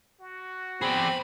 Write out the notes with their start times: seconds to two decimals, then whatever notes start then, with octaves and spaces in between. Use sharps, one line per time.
0.20 F#4
0.82 C4 G#4 D5 B5